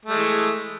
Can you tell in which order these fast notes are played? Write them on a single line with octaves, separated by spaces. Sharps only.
A3 G#3 E3